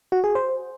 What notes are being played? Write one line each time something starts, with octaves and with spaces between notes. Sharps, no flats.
F#4
G#4
C5